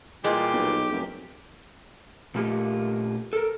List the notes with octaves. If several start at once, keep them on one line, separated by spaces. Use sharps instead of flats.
A#2 E3 G3 G#3 G4
B1
F1 F#2
A#2 A3 A#3 F4 G4
A4 A#4